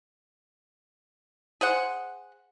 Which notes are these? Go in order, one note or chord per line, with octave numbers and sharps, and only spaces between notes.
G#4 C5 F#5